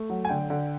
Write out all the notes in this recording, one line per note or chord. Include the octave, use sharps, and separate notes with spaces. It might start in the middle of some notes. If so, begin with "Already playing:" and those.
Already playing: A3
F#3
G#5
D3 G5
D3